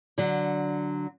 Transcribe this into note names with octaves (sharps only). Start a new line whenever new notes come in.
D3 F#3